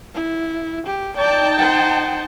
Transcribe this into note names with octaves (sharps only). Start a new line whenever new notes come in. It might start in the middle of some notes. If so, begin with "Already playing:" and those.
E4
G4
D#4 D5 G5 A5
C5 F#5